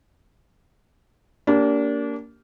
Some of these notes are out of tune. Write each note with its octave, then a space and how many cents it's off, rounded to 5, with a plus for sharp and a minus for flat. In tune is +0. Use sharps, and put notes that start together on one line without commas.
A#3 -5 D4 -30 G4 -10